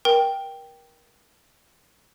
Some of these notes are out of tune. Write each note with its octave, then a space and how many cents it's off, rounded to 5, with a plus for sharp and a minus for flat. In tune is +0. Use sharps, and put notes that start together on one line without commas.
A#4 +30 G5 +0